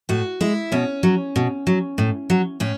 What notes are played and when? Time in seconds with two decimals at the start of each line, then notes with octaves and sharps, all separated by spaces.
0.09 A2 F#4
0.41 G#3 E4
0.72 B2 C#4
1.03 F#3
1.36 B2
1.67 F#3
1.98 A2
2.30 F#3
2.60 A2 C#4